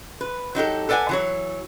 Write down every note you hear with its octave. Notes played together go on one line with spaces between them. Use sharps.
B4
F#3 D#4 G4 A4
A4 B4 D5 F#5 G#5
E3 F#3 C#5